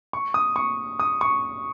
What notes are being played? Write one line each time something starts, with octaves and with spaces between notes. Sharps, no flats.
C#6
D#6
C#6
D#6
C#6